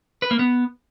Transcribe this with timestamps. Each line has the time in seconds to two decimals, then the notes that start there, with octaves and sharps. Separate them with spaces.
0.22 B4
0.31 A#3
0.39 B3